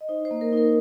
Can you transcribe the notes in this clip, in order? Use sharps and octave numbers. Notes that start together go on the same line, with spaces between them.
D#5
D#4 C5
C5
A#3
A#4
D#4
A#4